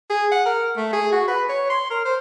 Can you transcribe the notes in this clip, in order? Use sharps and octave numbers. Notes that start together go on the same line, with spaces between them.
G#4
F#5
A#4
A3
G#4
F#4
B4
C#5
C6
A#4
C5